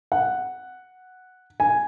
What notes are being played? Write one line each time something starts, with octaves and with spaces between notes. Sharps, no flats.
F#5
G#5